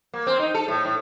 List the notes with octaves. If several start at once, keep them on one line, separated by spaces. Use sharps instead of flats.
A#3
C4
D#4
A4
A2
A2